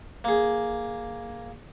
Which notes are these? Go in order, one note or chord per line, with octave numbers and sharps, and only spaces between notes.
A#3 G#4